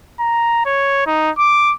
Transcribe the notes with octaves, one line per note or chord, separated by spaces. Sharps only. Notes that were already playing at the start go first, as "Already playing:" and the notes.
A#5
C#5
D#4
D6